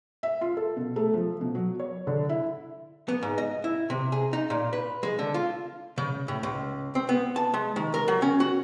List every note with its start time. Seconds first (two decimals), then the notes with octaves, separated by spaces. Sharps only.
0.23 E5
0.41 F4
0.57 A4
0.77 B2
0.96 A3
1.14 F3
1.41 B2
1.55 F#3
1.80 C#5
2.07 D3
2.29 E4
3.08 B3
3.23 G#2
3.38 D#5
3.64 E4
3.90 C3
4.12 G#4
4.33 D#4
4.50 A#2
4.73 B4
5.03 G#3
5.19 D3
5.34 F4
5.98 C#3
6.28 A2
6.43 C#2
6.95 C4
7.09 B3
7.36 A5
7.54 G#3
7.76 D#3
7.94 A#4
8.08 F#3
8.22 C#4
8.40 F#4